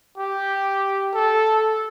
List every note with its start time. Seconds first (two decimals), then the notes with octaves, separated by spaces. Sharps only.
0.18 G4
1.14 A4